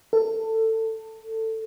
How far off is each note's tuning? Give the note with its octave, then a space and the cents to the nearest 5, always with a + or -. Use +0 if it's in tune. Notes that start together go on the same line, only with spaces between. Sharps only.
A4 +20